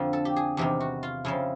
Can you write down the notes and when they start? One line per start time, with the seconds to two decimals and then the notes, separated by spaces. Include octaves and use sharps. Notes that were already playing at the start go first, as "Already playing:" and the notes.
Already playing: F2 D3 F3
0.13 A4
0.25 G4
0.36 G#4
0.57 E2 C3 D#3 G4
0.80 F#4
1.03 F4
1.25 F2 C#3 F3 E4